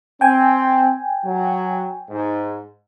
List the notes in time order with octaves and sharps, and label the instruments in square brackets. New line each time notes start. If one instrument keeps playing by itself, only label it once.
[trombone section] C4 [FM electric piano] G5 G#5
[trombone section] F#3
G#2